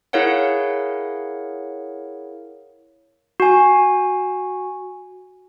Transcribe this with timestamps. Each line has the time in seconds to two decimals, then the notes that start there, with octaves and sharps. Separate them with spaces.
0.13 E4 G#4 A#4 C#5 F5 F#5
3.40 F#4 G#5